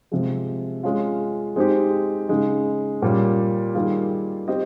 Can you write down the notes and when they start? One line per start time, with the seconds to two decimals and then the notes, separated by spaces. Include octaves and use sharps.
0.12 C3 F3 G#3
0.83 G#3 C#4 F4
1.56 G#3 C4 D#4 G4
2.29 C#3 G#3 D#4
3.02 A#2 G3 C#4
3.75 D#3 G3 A#3 F4 G#4
4.48 C4 G4 C5 D#5